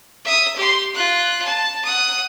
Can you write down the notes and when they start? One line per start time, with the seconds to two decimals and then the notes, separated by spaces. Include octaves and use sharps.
0.25 E5 D#6
0.56 G4 C6
0.94 F4 F#6
1.45 A5
1.84 F#5 D#6